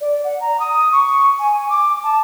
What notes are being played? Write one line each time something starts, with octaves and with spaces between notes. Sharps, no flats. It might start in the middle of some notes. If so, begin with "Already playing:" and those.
D5
F#5
A#5
D#6
C#6
G#5
D6
A5